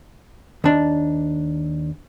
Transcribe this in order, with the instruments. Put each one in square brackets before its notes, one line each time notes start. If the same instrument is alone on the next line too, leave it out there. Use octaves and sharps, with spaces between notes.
[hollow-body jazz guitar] D#2 D4